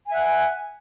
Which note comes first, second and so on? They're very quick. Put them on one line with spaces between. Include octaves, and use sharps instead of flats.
G#5 E5 F#5